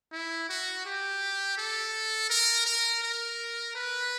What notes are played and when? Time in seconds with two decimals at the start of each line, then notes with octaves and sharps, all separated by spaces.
0.12 E4
0.49 F#4
0.85 G4
1.58 A4
2.30 A#4
2.66 A#4
3.03 A#4
3.75 B4